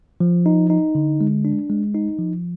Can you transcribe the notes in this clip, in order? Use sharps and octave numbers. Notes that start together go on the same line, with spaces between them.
F3
D#4
D#4
D3
G#3
D4
G#3
D#4
F3